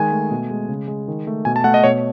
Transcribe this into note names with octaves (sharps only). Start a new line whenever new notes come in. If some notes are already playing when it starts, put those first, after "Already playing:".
Already playing: D#3 G#3 G#5
A3
B2
G#3
C#3
G#3
D#3
A3
B2 G#5
A5
A3 F#5
D#5
B2 C#5